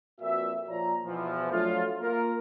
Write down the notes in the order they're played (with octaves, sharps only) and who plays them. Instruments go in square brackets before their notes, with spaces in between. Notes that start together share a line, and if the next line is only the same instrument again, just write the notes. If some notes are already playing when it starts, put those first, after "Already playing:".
[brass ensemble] F2 A#2 F#4 B4 E5
A#2 F3 C#5 D5 A#5
E2 B2 E3 F3
F3 F#3 A3 D4 F4
A#3 F4 A#4